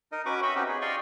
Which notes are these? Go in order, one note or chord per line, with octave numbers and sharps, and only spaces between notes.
D#4 A#4 D#5
C#4 F#4 B4 F#5 C#6 D6
D#5 E5 G5 B5 C#6
C4 C#4 D#4 F#4 G4
G#4
D5 D#5 F5 G5 C6 C#6